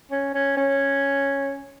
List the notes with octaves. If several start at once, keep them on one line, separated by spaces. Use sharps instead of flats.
C#4
C#4
C#4